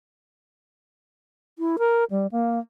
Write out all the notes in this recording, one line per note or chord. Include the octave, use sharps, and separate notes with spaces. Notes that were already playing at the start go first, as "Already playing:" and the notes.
E4
A#4
G3
A#3